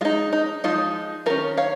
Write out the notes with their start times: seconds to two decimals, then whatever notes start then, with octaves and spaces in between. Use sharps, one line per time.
0.01 G#3 F4
0.05 D#4
0.33 D#4
0.64 F3 G#3 D#4 F4
1.26 D#3 C#4 F4 A#4
1.57 C#5 F5